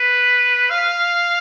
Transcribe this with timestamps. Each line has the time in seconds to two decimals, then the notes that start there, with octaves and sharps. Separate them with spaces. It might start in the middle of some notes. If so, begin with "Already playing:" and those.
Already playing: B4
0.70 F5